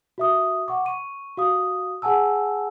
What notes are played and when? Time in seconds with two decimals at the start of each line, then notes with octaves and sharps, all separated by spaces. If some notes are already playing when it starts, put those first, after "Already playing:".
0.18 F#4 E5 D#6
0.68 F#5 C#6 D6
0.86 C#6 D#7
1.37 F#4 F5 D#6
2.02 G#4 F#5 G#5 A5 E6